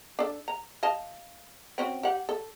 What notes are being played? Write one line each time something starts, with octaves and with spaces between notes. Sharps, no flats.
D4 A4
A#5
D#5 F5 A5
C4 C#4 F#4
G4 F#5
A4